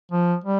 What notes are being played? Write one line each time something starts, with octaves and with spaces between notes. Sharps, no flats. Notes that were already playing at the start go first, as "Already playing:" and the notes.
F3
G3